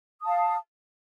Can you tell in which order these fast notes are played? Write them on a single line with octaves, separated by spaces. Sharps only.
D#6 A5 F5